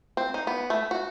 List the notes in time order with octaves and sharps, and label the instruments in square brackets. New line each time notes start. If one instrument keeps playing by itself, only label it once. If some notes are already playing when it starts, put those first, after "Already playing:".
[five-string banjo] C4
D#4
B3
A3
F#4